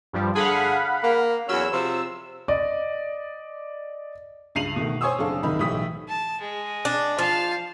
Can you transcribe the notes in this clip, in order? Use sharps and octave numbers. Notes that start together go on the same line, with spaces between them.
G2 F3 G3
D3 G#4 F5 F#5 B5
A#3
E2 F#3 C#4 E6
C3 F3
D5 D#5
C#2 G2 C7 D#7 F7 F#7
B2 D#3 A3
C5 C#5 G#5 C#6 D#6 E6
F#1 C4 D4 A4 F5
F#1 C2 D#3 D#4 B5
B1 A2 E3 G4 D#6 B6
A5
G#3
D4
F3 F5 A5